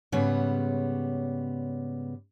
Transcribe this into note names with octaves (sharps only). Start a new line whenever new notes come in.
G#2 C#3 G3 B3 C#5